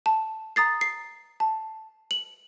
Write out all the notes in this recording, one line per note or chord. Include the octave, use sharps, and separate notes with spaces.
A5
A#5 D#6 A6 C7
C7
A5
F#7